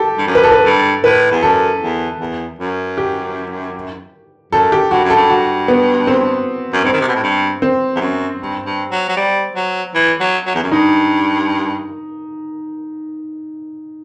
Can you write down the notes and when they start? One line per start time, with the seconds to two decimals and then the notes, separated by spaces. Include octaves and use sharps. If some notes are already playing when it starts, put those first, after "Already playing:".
Already playing: G4 A4
0.18 G2
0.27 F#2
0.35 B4
0.44 A4
0.52 B4
0.65 G2 A4
1.04 A2 B4
1.31 E2
1.43 F#2 A4
1.81 E2
2.20 E2
2.59 F#2
2.98 G4
4.53 F#2 A4
4.72 G4
4.91 G2 F#4
5.04 F#2
5.10 A4
5.16 G2
5.30 F#4
5.68 B3
6.07 C4
6.73 F#2
6.84 G2 C4
6.93 D#3
7.01 C3
7.08 B2
7.15 A2
7.23 G2
7.62 C4
7.96 E2
8.00 F#2
8.40 G2
8.66 G2
8.91 F#3
9.09 F#3
9.17 G3
9.56 F#3
9.95 E3
10.20 F#3
10.46 F#3
10.55 E2
10.63 F#2
10.71 G2 D#4